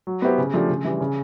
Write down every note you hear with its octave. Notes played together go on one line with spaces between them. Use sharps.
F#3
B3 E4 G4 C5
C#3
F3 A3 D4 G4
C#3
E3 G3
C#3